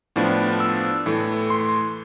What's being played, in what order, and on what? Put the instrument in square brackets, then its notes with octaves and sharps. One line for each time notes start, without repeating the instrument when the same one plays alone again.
[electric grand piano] A2 F3 B3 D4
E6
A2 E3 A3
C6